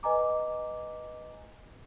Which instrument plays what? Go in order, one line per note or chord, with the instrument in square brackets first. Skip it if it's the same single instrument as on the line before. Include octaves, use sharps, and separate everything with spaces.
[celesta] B4 D#5 G#5 A#5 D6